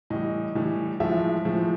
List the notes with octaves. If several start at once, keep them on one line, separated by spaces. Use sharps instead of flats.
A2 E3 G3 D#5
A2 E3 G3
A2 F3 G#3 E5
A2 F3 G#3